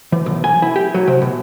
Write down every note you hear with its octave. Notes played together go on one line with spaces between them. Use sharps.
E3
B1
G#5
E4
G4
F#3
C3
B2